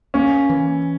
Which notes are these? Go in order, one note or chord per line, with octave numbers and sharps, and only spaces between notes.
A#3 C#4
E3